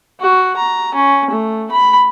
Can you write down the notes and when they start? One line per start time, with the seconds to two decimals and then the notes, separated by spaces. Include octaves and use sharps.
0.20 F#4
0.57 A#5
0.95 C#4
1.30 A3
1.71 B5